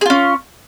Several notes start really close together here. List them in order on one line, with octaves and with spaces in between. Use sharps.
G#4 F4 C#4